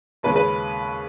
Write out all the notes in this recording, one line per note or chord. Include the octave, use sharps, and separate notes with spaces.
D#2 C#3 G#3 C#4 B4
B4